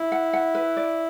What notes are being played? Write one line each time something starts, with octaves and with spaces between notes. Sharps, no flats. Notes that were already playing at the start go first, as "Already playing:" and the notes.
Already playing: E4
F#5
F#5
B4
D5